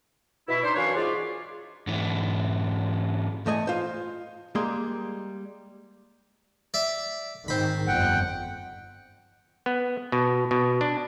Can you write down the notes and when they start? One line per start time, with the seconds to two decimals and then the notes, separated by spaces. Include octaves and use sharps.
0.48 B2 E4
0.63 D4 D#4 C5
0.76 F#2 E3 D4 C#5 F5
0.95 G#2 F4 D5
1.87 G#2 E3
3.46 E2 A3 D#5 G#5
3.67 F4 C5
4.55 G3 G#3 A#3 G#4 C6
6.74 D5 E5
7.48 G#2 D#3 C4 B5
7.88 G1 F2 F#5 G5
9.66 B3
10.12 B2
10.51 B2
10.81 D4